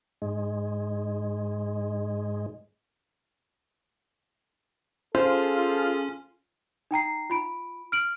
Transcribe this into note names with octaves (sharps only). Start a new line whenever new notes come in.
G#2 G#3
C#4 F4 G#4 A4 C5
D#4 G5 A#5 C7
F4 B5 D7
F6 D7 F#7